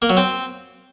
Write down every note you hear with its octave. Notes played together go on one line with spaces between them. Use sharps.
A#3
F#3
C4